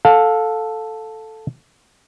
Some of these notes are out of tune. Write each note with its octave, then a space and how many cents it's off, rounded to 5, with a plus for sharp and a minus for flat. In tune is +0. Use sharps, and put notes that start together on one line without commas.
A4 +0 F5 +25